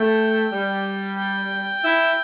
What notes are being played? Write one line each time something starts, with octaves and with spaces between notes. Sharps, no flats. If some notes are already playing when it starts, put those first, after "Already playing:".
Already playing: A3 G5
G3
G5
E4